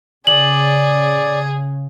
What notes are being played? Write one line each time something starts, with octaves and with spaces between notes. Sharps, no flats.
C#3 G#4 D5 F#7